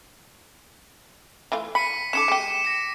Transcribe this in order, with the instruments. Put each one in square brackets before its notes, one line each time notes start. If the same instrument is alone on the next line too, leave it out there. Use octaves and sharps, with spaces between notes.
[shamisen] E3 A3 F4
[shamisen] B5 [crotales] B6 C#7 D#7
[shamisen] C#4 D#4 A4 [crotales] D6 C#7 E7
[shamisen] G#3 G4 [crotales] D7
[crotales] A#6 C#7